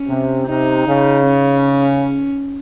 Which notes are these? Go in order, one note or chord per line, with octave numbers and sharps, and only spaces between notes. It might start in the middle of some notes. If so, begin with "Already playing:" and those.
Already playing: C#4
C3
C3 D#4
C#3
C#4